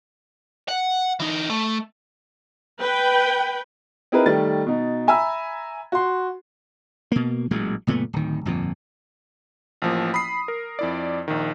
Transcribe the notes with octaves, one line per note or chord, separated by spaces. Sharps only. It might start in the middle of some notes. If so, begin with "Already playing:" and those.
F#5
E3 D#4
A3
B4 G5
C4 D#4 E4 G#4 A#4 B4
D#3 G3 A3 A6
B2 D#4
E5 G#5 A#5 B5 E6
F#4 C6
B2 A#3
A1 A#2 F#3 G#3
F#1 A#2 A3 B3
D1 D#3
G1 F2 A#2
A1 F3 A#3
B5 D#6 C7
A#4
F2 E4 D5
A#1 D#3